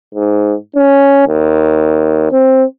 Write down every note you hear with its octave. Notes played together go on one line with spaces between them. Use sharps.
G#2
C#4
D#2
C4